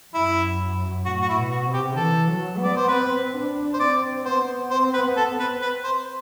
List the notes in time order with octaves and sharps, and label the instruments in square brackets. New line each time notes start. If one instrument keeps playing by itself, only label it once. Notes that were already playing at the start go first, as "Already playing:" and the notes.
[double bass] F#2 [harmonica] E4
[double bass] A2 [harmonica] F#4
[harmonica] F#4
E4
[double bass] B2
[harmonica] F#4
[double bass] C3
[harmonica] G4
[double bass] E3 [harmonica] A4
[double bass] F#3
B3
[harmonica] D5
C5
[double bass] C4 [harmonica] B4
[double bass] D4
[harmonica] C5
[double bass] C4 [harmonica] D5
[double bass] B3 [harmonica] C5
[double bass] C4 [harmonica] C5
[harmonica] B4
[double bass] B3
[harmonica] A4
[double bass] C4
[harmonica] B4
B4
C5